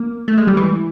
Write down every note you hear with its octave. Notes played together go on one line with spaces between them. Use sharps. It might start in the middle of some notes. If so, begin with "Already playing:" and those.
Already playing: A#3
A3
G#3
G3
E3